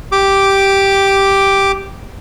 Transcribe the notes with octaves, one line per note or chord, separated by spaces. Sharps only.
G4 D6